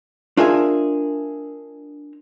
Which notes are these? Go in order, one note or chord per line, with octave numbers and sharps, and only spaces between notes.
D4 F4 G#4 A#4 E5 G#5